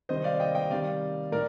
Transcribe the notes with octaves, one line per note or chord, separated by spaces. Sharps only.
C3 D#3 G3 C5 D#5
D5 F5
D#5 G5
D#5 G5
C3 D#3 G3 D5 F5
A2 A#4 D5